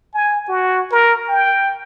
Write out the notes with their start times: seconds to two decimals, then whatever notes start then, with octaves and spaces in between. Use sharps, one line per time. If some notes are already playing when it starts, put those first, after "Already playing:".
0.14 G#5
0.49 F#4
0.91 A#4
1.28 G5